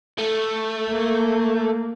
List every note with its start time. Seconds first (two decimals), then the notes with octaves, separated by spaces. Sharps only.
0.19 A3
0.90 A#3